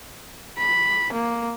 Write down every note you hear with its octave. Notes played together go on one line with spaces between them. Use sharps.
B5
A#3